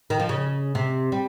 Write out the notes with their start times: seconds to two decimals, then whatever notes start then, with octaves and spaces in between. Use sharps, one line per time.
0.10 D#3
0.20 F3
0.29 C#3
0.75 C3
1.12 G3